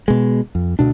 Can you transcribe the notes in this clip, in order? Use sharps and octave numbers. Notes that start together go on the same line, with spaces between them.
B2 G#3
F2
D2 B2 D4